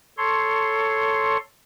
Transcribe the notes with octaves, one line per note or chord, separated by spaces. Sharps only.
A4 C#5 C6